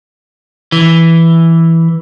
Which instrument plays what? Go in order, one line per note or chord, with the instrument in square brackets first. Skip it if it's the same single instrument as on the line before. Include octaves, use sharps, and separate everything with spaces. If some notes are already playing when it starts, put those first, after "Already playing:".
[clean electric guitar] E3